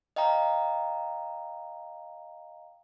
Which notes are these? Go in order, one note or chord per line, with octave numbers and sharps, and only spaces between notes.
D#5 F5 G5 A#5